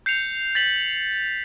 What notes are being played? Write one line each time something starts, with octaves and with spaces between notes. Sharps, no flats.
G6 C7 C#7 F7
A6 B6 F#7